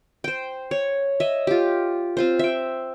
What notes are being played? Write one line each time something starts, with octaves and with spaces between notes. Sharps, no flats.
C5 G5
C#5
D#5 E5
F4 G4
C4 F4 C5
E5 G5